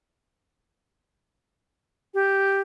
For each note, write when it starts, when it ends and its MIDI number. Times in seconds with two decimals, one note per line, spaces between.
2.14 2.61 67